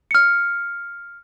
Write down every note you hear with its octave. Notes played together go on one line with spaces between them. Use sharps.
F6 C#7